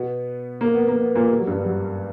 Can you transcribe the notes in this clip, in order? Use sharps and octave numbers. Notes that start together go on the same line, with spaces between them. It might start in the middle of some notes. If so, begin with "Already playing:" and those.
Already playing: B2 B3
A#3
B3
A#3
B3
A#2 A#3
G3
F#3
G2 G3
G3
F#2 F#3